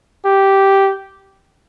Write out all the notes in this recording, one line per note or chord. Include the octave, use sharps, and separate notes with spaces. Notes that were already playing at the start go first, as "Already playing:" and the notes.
G4